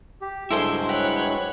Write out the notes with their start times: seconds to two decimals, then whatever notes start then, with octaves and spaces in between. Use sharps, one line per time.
0.21 G4
0.51 G2 F#3 G#3 E4 G#4 A4 C5 C6
0.89 G4 B4 C#5 F#5 F#6